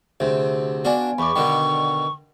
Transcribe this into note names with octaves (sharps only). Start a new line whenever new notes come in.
D2 C3 G#4
B3 D4 F#4 D5 G#5
E2 B5 C#6 D6
B2 D3 D#3 G5